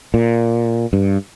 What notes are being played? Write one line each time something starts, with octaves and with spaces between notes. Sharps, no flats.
A#2
G2